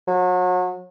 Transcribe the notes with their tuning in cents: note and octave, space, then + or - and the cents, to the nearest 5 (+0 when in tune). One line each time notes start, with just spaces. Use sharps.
F#3 -35